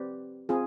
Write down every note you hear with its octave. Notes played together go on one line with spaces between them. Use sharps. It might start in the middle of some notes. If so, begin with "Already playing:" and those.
Already playing: C4 G4 B4 D5
C4 F4 G#4